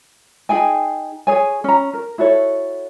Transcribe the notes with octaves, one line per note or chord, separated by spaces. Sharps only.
D#4 G#4 G5 G#5
G#4 C#5 G#5
C#4 A#5
A#4
E4 F#4 A4 C#5